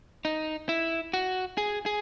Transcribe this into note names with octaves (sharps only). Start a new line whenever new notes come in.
D#4
E4
F#4
G#4
G#4